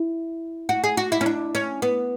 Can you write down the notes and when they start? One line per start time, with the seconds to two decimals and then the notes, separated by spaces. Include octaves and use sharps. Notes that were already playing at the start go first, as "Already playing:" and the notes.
Already playing: E4
0.69 F#4
0.84 G#4
0.97 F#4
1.12 E4
1.21 C#4
1.26 D4
1.55 C#4
1.82 B3